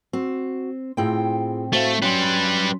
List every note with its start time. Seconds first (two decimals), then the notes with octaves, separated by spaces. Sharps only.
0.13 C4 F#4
0.97 A2 C4 E4 F4 G#4 G5
1.73 A3 F#4 C5 F5
2.02 F#3 G3 C#4 B4 C6